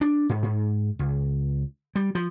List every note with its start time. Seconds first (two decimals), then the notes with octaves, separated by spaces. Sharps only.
0.01 D4
0.29 G#2
0.43 G#2
0.99 C#2
1.95 G3
2.15 F3